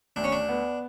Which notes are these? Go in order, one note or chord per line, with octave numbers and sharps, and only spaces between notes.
D2 D4
C#4
D4
B3